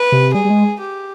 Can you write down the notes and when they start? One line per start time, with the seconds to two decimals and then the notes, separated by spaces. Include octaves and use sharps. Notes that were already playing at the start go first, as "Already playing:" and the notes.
Already playing: B4
0.12 C3
0.34 G3 G#4
0.45 G3
0.50 G#3
0.80 G4